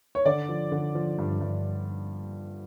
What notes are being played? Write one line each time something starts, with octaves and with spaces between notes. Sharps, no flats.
C#5
D3 D5
F3
D3
F3
G2
G2